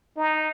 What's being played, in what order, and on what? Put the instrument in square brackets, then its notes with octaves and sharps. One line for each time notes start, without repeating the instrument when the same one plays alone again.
[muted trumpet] D#4